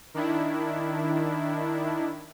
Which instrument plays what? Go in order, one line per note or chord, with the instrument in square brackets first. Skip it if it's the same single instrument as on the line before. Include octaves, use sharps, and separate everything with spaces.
[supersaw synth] D#3 D4 E4